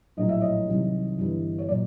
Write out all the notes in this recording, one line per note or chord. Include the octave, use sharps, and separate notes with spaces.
A#1 A2 F#3 D#5
E5
C#5 D#5
C2 C3 D#3 F#3
G1 G2 E3
C#5
A#2 F#3 D5